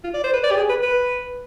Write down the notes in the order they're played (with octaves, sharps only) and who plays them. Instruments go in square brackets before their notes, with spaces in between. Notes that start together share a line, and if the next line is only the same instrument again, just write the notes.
[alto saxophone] F4
D5
C5
B4
D5
G4
G#4
B4
B4